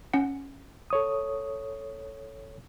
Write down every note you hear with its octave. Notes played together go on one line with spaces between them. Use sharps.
C#4 F#5
A4 C#5 D#6